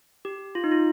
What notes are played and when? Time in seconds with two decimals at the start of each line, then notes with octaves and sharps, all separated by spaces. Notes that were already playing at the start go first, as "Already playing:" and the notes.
0.25 G4
0.55 F4
0.64 D#4
0.71 F4